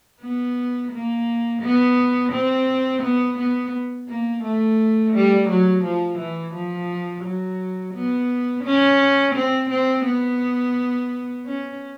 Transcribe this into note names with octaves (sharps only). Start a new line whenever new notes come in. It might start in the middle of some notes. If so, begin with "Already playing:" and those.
B3
A#3
B3
C4
B3
B3
A#3
A3
G3
F#3
F3
E3
F3
F#3
B3
C#4
C4
C4
B3
C#4